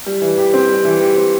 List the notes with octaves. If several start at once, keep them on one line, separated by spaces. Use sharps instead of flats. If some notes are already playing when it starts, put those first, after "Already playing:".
G3
E3
G4
C4
G3
E3
G4
C4